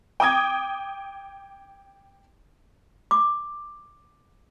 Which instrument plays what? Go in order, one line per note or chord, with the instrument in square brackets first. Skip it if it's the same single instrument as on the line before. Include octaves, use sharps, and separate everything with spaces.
[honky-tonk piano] G5 D6 D#6 G#6
[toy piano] D6